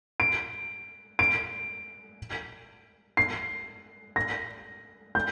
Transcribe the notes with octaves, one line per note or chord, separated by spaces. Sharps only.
D7
D7
C7
A#6
G6